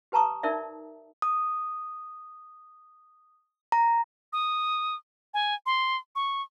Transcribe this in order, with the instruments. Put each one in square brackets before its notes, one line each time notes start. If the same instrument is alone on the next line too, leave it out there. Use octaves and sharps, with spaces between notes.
[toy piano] G4 B4 A5 A#5 C#6 D#6
D#4 A#4 D5 E5
[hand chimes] D#6
A#5
[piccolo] D#6
G#5
C6
C#6